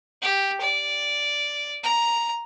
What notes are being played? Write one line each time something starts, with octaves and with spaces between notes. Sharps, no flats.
G4
D5
A#5